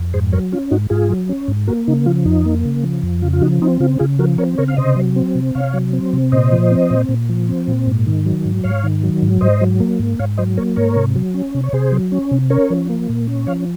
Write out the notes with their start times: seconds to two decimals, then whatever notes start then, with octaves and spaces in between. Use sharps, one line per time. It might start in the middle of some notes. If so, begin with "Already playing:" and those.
Already playing: F2
0.14 G#2 G#4 C5
0.32 F#3 A#4 C#5
0.52 C#4 F4
0.71 G#2 D#4 F#4
0.90 G#2 F4 G#4
1.10 F#3
1.29 C#4
1.48 G#2
1.67 A#3 F#4 A#4
1.88 C#3 D#4
2.06 F3 F4
2.25 F2 D#4
2.46 A#3
2.65 C#3
2.83 F3
3.03 F2
3.22 C#3 F4
3.33 F4
3.41 F3 D#4 F#4
3.62 C4 D#4
3.80 C#3 F4
3.99 C#3 F4 G#4
4.19 F3 F#4 A#4
4.38 C4 A#4 C#5
4.58 C#3 A#4 C#5
4.68 F5
4.77 C3 C5 D#5
4.96 F#3
5.16 C4
5.35 C3
5.55 C3 C#5 F5
5.74 F#3
5.93 C4
6.13 C3
6.32 A#2 C5 D#5
6.52 F3
6.71 C4
6.91 A#2
7.09 A#2
7.29 F3
7.49 C4
7.68 A#2
7.87 G#2
8.07 D#3
8.26 F#3
8.45 G#2
8.64 G#2 C#5 F5
8.84 D#3
9.03 F#3
9.22 G#2
9.41 G#2 C5 D#5
9.61 F#3
9.80 A#3
9.99 G#2
10.19 G#2 C#5 F5
10.37 F#3 C5 D#5
10.57 A#3 A#4 C#5
10.76 G#2 A#4 C#5
10.96 C3
11.16 F#3
11.34 C#4
11.55 C3
11.63 C#5
11.73 C3 G#4 C5
11.92 F#3
12.12 C#4
12.31 C3
12.50 C#4 A#4 C#5
12.70 F3
12.90 A#3
13.09 A#2
13.28 C#4
13.47 F3 C#5 F5